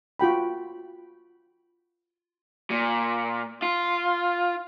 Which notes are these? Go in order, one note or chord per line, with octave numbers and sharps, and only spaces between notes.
F4 F#4 G5 B5
A#2
F4